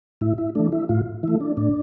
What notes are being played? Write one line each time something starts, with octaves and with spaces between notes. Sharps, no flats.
A2 E4
E4
E3 A3 D4
E4
A2 F4
E3 A3 E4
D4
A2 D4